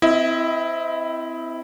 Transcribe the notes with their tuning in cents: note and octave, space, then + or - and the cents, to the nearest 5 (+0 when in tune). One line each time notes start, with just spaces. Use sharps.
C4 -15 E4 +0 D#5 +35